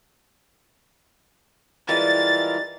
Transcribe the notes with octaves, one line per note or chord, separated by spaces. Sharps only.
E3 G3 G#3 C#4 E4 F4 A#4 A6